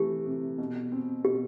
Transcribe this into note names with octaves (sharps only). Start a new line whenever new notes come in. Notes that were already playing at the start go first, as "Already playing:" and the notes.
Already playing: C3 E3 A3 G4
C3
B2
C4
B2 G4